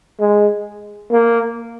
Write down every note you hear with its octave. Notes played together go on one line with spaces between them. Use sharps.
G#3
A#3